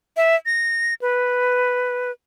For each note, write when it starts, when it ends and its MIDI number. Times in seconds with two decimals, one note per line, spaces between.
0.17 0.36 76
0.46 0.94 94
1.02 2.12 71